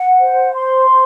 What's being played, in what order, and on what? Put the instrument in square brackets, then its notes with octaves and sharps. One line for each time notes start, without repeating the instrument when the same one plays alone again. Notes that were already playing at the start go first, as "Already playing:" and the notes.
Already playing: [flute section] F#5
C5
C6
C5